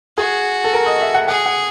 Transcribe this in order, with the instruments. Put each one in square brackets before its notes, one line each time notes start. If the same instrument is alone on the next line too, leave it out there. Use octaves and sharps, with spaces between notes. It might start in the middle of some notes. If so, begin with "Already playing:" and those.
[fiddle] F#4 [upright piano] G#4
[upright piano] A4
A#4
D#5
E5
F#5
[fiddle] G#4 [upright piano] F#5
[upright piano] F#5